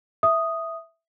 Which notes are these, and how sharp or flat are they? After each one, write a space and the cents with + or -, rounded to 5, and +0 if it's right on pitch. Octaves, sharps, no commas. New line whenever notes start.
E5 +0 D#6 +0